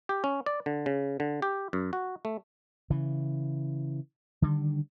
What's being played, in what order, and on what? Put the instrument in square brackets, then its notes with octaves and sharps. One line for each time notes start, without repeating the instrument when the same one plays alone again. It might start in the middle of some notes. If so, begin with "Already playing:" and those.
[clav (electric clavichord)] G4
C#4
D5
D3
C#3
D3
G4
F#2
F#4
A3
[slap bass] C#3 E3
D3 D#3 G3